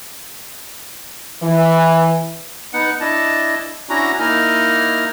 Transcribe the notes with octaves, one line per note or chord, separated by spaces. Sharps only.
E3
B3 D#4 F#5
D4 E4 D#5 A5
C#4 D4 E4 F#4 A#5
A#3 D#4 E4 D#5 F6